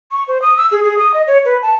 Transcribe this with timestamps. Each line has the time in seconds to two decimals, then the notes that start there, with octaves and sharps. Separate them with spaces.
0.12 C#6
0.28 C5
0.42 D#6
0.57 E6
0.72 G#4
0.84 G#4
0.99 D#6
1.14 D#5
1.27 C#5
1.45 B4
1.62 A5